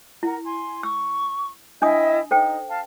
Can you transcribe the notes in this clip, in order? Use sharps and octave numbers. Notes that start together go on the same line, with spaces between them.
E4 A#4 F#5
G#5 C6
C#6 E6
D4 E4 D#5 G5 G#5 D#6
D#4 A4 C5 G5
F5 A5